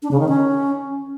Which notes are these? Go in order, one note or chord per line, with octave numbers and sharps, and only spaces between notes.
D4
C#3
D#3
C#4